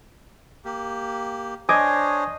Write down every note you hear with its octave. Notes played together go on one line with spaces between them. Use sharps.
A#3 G4
D4 C5 C#5 D#5 G#5 D6 G#6